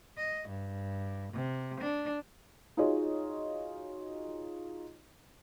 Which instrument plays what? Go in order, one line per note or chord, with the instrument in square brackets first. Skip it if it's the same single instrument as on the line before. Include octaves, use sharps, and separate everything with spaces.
[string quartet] D#5
G2
C3
D4
[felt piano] D#4 F4 F#4 G#4 C#5 D#5